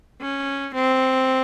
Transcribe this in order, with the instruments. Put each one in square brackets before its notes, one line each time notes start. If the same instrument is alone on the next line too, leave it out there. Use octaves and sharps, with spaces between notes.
[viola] C#4
C4